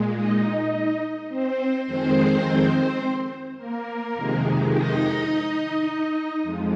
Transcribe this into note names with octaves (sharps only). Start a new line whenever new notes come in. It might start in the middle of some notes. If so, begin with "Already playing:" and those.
Already playing: A#2 G#3
D#4 D#5
C4 C5
F2 D#3 G#3 C4 C5
A#3 A#4
F2 C3 D#3 G#3
D#4 D#5
F2 F3 G#3